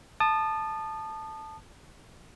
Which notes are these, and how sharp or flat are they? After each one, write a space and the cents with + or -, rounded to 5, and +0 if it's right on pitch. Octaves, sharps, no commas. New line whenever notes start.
A5 +0 D#6 -30